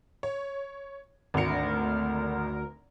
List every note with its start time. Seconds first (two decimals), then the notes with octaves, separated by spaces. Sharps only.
0.23 C#5
1.34 G#1 D2 A#4 C#7